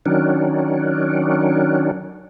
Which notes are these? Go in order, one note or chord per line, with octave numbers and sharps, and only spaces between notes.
D#3 F#3 C#4 D4